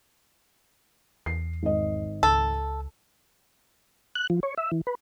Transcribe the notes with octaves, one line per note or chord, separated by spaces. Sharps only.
E2 C7
G#1 D#5
C#2 A4
F#6
F3
C#5
E5
E3
B4